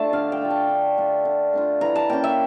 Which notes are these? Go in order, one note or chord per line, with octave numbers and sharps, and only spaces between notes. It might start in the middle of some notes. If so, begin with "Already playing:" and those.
Already playing: A3 D4 F4 A5
D3 F5
G5
A3 D4 F4
A5
D3
A3 D4 F4
D3
A3 D4 F4
E3 A#5
A5
A#3 C#4 G5
E5